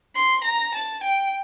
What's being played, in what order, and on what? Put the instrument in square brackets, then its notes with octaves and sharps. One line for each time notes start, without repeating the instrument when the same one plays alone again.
[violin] C6
A#5
A5
G5